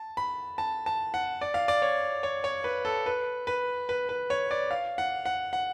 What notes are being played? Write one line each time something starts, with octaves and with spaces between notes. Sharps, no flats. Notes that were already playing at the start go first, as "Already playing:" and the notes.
Already playing: A5
B5
A5
A5
F#5
D5
F5
D5
C#5
C#5
C#5
B4
A4
B4
B4
B4
B4
C#5
D5
F5
F#5
F#5
F#5